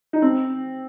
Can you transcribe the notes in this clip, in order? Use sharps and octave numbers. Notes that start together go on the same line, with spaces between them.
D#4
C4